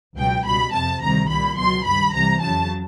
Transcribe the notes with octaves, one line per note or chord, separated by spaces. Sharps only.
C#2 B2 F#3 G5
C#2 B2 G3 B5
F2 C3 F3 A5
D2 C3 D#3 G3 A#5
C2 A#2 G3 B5
C#2 B2 F#3 C6
G2 D#3 G3 B5
C2 C3 E3 G3 A#5
F2 C#3 F#3 A5